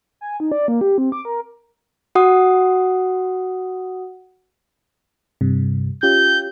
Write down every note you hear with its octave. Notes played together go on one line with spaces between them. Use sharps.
G#5
D#4
D5
A#3
G4
C4
D6
A#4
F#4 F#5 D#6
G2 C3
C#4 F4 G4 G6